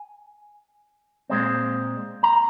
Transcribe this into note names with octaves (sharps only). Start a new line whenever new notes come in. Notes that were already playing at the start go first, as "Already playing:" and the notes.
Already playing: G#5
A#2 G#3 C4
A#5